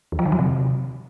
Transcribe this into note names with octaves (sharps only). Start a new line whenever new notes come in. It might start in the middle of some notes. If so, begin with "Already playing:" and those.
E2
F3
D#3
F#3
C3